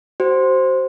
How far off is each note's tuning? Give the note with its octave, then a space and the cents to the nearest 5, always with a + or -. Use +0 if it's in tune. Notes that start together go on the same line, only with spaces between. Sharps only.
F#4 +35 C5 +0